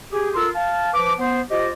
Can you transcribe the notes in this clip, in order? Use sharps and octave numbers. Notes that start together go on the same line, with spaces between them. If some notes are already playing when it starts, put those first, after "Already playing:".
G4 G#4
F4 A4 A#4 C6 E6
F5 A5
F3 B4 D6
B3 C5
F4 G4 C5 D#5